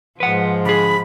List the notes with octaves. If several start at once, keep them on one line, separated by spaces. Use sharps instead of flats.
G#2 F3 B4 F#5
D3 G#4 B5